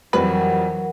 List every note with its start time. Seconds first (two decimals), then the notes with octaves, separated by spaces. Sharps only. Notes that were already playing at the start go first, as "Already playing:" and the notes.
0.13 F2 E3 F#3 G3 A#4 B4 F#5